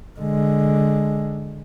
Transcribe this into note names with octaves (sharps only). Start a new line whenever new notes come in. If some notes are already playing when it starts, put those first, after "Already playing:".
D3 G#3